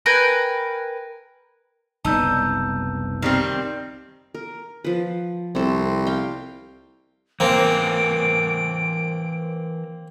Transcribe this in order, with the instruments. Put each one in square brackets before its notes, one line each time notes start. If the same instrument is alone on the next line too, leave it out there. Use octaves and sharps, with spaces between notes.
[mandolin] A#4 B4 G5 G#5
[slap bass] F#1 C2 B3 [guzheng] D#4 [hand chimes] A5 E6 G6
[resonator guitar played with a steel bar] D#3 G3 C4 [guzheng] F5
[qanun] A#4
F3 B4
[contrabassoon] C2 [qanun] C4 A4
[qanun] F5 G5
[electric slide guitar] E3 A#4 C5 [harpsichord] A#3 C4 [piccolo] D7